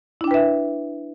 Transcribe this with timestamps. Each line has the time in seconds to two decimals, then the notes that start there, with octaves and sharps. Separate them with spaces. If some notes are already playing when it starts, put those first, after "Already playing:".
0.21 E4
0.24 D4
0.27 G5
0.31 B4
0.34 E5